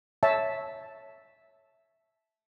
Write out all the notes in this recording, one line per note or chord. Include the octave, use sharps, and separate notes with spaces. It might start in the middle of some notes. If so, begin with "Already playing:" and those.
C#5 E5 A5